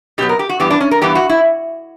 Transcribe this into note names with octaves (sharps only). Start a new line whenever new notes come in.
B2 F#3 B3 G4
A#4
G4
F#4
G2 E3 B3 G4
D4
C#4
A#4
G2 E3 B3 G4
F#4
E4